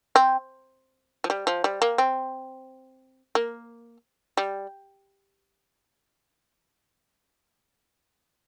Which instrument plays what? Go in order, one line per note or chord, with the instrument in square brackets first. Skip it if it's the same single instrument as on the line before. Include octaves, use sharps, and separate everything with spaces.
[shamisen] C4
F3
G3
F3
G3
A#3
C4
A#3
G3